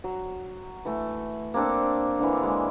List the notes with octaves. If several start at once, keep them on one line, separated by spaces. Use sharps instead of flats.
F#3
E3 A3
A#3 C4 D4 A4
D3 E3
G#3